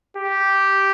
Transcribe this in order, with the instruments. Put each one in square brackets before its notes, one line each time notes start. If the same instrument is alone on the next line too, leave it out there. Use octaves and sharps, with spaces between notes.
[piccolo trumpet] G4